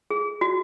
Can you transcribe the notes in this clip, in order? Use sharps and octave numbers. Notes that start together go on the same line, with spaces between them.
G#4
F#4